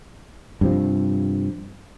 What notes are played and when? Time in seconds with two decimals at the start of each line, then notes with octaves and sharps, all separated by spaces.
0.61 G2 C3 F3